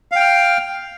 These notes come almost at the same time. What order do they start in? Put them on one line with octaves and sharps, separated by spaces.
F5 G5 F6